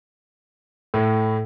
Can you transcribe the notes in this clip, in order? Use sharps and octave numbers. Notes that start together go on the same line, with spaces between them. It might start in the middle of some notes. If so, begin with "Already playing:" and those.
A2